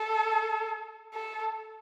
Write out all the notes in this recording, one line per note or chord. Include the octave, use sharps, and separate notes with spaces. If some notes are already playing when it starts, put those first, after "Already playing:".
Already playing: A4
A4